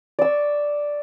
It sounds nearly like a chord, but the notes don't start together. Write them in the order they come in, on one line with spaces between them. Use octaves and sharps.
D5 E6 C#6